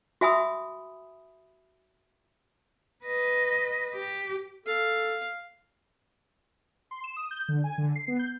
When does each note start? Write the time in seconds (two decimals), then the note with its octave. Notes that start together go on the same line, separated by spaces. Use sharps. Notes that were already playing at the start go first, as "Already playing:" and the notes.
0.21 F#4 E5 G#5 B5 D#6 E6
3.05 B4 D#5
3.95 G4
4.66 A4 F5
6.91 C6
7.04 E7
7.16 D#6
7.31 G6
7.48 D3
7.64 G#5
7.78 D3
7.96 C7
8.08 B3
8.19 G6